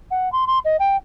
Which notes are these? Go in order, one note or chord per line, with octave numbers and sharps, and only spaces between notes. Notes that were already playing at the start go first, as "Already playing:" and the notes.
F#5
C6
C6
D#5
G5